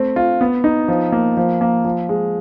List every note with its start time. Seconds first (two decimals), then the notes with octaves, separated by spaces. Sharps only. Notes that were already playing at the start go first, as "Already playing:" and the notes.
Already playing: A3 C4
0.16 F4
0.41 B3
0.64 D#4
0.88 F3
1.12 A#3
1.37 F3
1.61 A#3
1.85 F3
2.09 G#3